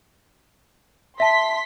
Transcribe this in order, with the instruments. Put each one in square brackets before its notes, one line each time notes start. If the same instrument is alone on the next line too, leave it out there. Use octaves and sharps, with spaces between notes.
[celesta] E5 A5 [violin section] C6 B6